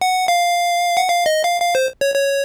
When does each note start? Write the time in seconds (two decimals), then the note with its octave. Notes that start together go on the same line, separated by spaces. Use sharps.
0.01 F#5
0.28 F5
0.97 F#5
1.08 F5
1.26 D#5
1.44 F5
1.62 F5
1.75 C5
2.01 C#5
2.15 C#5